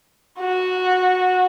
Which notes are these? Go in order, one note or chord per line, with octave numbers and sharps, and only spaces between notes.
F#4